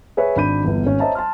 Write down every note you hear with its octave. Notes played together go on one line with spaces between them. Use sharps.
G#4 B4 C#5 E5
G#1 D4 B5 G6 D#7
G1 E2
G#1 C#4
C5 C#5 D#5 E5 A5 A#5
A5 C6 F6